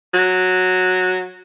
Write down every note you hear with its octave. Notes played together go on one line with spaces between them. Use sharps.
F#3